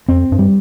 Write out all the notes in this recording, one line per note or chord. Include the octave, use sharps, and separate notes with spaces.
F2 C4
G2
G3